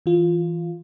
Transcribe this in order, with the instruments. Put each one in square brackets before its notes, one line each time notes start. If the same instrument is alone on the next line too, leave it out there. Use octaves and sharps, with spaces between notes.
[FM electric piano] E3 F4